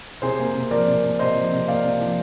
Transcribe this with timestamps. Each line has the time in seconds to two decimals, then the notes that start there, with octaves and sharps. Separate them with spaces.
0.22 C3 G#4 C5
0.39 A#3
0.55 C3
0.71 F3 A#4 D5
0.87 C3
1.03 A#3
1.19 C3 C5 D#5
1.35 F3
1.52 C3
1.68 A#3 D5 F5
1.84 C3
2.00 F3